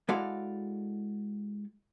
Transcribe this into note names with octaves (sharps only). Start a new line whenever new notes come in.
G#3 E4 F#4 A4 D5 F5